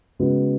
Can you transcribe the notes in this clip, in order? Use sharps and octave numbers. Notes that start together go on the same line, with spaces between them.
C#3 G#3 B3 F#4